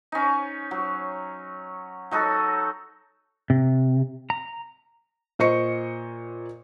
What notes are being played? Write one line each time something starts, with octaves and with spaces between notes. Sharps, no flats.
C#4 D#4
F#3
F#3 D#4 F#4 A4
C3
A#5
A#2 C5 D#5 C#6 C#7